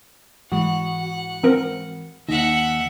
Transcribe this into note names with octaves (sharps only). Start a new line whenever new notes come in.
G#2 E3 G#3 F#4 F#5
F3 C4 A#4
D#2 D#4 E5 F#5